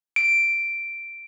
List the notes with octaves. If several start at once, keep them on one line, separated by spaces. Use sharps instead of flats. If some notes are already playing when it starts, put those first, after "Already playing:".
D7